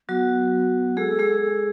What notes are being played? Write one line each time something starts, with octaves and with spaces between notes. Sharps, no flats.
F#3 B3 F#4
G#3 G#4 A4
G#3 G#4
A4